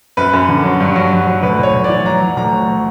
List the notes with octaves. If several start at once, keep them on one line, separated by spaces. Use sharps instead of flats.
F#2 B4
F#2
D3
F#3
G2
F#3
F#3
F#3
D2 B4
D2 C#5
D2
E3 D5
F#3 A#5
F#3
D2 A#5
F#3